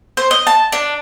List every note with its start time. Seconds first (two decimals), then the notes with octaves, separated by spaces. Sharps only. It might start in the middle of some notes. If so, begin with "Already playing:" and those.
0.17 C5
0.31 D#5
0.47 A5
0.72 D4